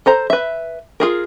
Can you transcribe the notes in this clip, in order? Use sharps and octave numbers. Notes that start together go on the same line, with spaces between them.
A4 C5 A#5
B4 E5
F4 G#4 A#4